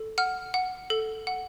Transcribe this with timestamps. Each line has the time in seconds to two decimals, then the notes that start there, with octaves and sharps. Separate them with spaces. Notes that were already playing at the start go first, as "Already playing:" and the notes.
Already playing: A4
0.18 F#5 F6
0.54 F#5
0.90 A4
1.27 F#5